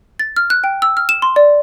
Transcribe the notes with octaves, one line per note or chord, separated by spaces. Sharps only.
A6
F6
F#6
G5
E6
F6
E7
C6
D5